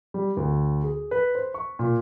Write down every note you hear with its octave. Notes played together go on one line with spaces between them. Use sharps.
G3
D2
G#4
B4
C5
C#6
A#2